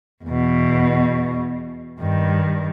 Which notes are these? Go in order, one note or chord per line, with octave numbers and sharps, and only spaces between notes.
E2 B2
G2 D#3